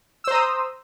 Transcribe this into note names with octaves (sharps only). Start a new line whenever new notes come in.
C5 A#5 D#6 E6